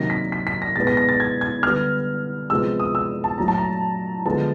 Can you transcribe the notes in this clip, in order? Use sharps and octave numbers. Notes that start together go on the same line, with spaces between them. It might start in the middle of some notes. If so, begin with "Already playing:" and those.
Already playing: C3 D#3 F#3 A#3 A#6
B6
B6
B6
A#6
B2 G#3 B3 A6
A#6
A#6
A6
G#6
G#6
D3 G3 B3 F6
C3 F3 G#3 B3 E6
D#6
E6
A5
A#2 F#3 A3 A#5
A5
A#5
D3 F3 G#3 B3 A5